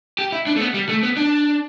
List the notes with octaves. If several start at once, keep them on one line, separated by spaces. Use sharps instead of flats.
G4
E4
D4
A3
B3
G3
A3
B3
D4